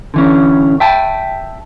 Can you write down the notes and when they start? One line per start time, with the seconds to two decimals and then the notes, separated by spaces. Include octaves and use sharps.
0.14 D3 E3 C#4
0.80 E5 G5 A5